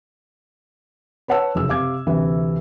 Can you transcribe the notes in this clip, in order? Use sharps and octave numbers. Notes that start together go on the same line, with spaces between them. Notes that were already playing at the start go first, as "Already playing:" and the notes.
B4 C#5 F#5 A5 E6
F1 F#2 C#3 E6
C3 F5 D6 G#6
D2 C3 E3